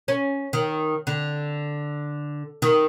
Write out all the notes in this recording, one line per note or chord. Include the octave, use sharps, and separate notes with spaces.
C#4
D#3
D3
D#3